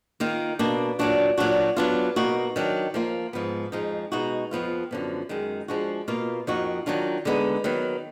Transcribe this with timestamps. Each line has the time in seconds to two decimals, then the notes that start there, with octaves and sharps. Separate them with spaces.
0.20 D#3 A#3 F4
0.59 B2 A#3 D4
0.99 A#2 F#3 D4 F#4
1.38 A#2 F#3 D4 F#4
1.77 D#3 F#3 B3 D4 F4
2.16 B2 A#3 D#4 F#4
2.56 D#3 F#3 D4
2.94 F3 A#3 F4
3.33 G#2 F3 B3
3.72 F2 F3 G#3 D#4
4.12 B2 G#3 D#4 F#4
4.51 F2 F3 B3 F4
4.91 F#2 D3 F3 B3
5.29 F#2 D#3 G#3
5.68 F3 G#3 D4 F#4
6.08 B2 A#3 F4
6.47 F2 F3 A#3 D#4 F#4
6.86 D#3 F#3 D4 F4
7.25 D3 G#3 B3 D#4
7.64 D#3 F#3 B3